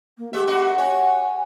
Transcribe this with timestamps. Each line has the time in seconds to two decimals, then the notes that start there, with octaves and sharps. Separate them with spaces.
0.17 A#3
0.33 G#3 G4 E5
0.47 F#2 F#4 D#5
0.78 F#4 C#5 G#5